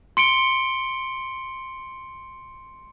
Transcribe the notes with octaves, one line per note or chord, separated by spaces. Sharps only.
C6 C#7 D7 G7